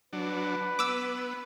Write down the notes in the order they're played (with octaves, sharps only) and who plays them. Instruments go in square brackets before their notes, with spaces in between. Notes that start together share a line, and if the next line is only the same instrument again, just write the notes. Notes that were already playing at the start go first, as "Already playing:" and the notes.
[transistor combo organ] F#3 D4 [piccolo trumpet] B4
[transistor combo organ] B3 [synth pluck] D6 E6